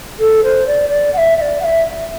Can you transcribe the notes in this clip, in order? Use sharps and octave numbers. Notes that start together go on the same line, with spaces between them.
A4
C5
D5
D5
F#5
E5
E5
D5
F#5
E5